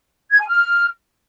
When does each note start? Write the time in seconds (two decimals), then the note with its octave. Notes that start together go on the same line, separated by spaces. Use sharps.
0.31 G#6
0.40 G#5
0.48 F6